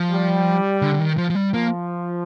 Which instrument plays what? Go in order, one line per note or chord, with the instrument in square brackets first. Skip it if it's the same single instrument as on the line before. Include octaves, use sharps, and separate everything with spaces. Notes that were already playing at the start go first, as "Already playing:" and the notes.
Already playing: [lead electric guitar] F3
[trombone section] G3
[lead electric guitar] D3
D3
D#3
F3
F3
G3
[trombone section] F3 [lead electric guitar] A#3